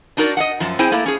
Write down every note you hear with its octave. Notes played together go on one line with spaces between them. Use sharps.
D4 D#4 F#4 A#4 D5
D#5 F5 F#5
F#2 F3
C4 E4 G#4 C5 G5 G#5
A3 A#3 E4
C#4 G#4